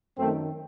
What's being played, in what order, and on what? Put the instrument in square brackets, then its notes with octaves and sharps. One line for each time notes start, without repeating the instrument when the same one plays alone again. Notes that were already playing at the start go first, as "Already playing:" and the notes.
[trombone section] F#2 D#3 A3 C4